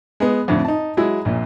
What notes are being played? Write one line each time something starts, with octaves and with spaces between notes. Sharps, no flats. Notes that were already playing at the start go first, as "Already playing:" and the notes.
G#3 B3
F2 A2 D3
D#4 A5
F#3 G#3 E4
A#1 A#2